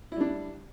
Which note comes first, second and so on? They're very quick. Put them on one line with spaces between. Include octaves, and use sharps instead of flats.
E4 G3 D4